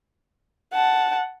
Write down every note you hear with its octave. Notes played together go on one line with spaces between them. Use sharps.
F#5 A5